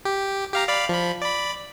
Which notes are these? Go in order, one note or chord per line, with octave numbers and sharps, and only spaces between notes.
G4
G4 F5 A#5
D5 F5 B5
F3 B5
D5 B5